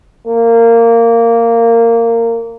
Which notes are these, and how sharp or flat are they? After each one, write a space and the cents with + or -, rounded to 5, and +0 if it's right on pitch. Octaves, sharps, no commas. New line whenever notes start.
A#3 -15